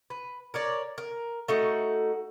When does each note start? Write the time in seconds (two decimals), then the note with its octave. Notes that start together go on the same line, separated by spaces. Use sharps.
0.10 B4
0.54 A#4 C#5 D5
0.98 A#4
1.48 A3 D#4 F#4